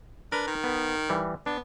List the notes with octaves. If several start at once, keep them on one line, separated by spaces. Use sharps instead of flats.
D4 A#4 B4
D#3
B3
E3 G3
B3 D4